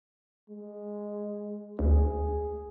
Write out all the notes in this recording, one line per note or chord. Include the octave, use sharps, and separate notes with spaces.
G#3
D2 G#4